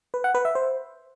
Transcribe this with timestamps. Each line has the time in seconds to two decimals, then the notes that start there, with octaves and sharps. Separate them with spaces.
0.14 B4
0.24 F#5
0.35 B4
0.45 E5
0.55 C5